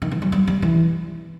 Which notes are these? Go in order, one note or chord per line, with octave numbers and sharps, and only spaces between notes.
D#3
E3
F#3
G3
G3
E3